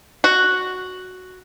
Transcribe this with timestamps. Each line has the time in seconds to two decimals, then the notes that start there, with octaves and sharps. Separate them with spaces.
0.24 F#4